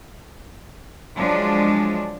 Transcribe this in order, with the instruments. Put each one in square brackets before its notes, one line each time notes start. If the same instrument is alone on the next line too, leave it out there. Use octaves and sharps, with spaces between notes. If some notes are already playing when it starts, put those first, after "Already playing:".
[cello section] F3 F#3 G#3 D4